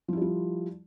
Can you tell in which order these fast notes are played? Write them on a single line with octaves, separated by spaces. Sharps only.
F3 E4 G3 F4